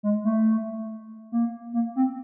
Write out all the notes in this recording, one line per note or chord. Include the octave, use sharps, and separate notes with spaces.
G#3
A3
A#3
A#3
C4